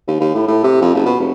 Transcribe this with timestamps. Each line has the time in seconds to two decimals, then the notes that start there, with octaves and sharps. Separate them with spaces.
0.07 D#2
0.20 D#2
0.34 A2
0.47 A2
0.63 C3
0.81 F2
0.94 F#1
1.06 B2
1.20 F1